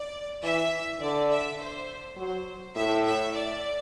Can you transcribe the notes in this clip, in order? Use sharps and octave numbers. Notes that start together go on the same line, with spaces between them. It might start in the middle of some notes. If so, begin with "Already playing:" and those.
Already playing: D5
E3 E5
D3 D5
E5
C5
F#3 C5
A2 E5
E5
D5